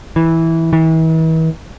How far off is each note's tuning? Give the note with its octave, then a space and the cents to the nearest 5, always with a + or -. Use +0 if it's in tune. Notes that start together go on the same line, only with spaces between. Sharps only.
E3 -10
E3 -40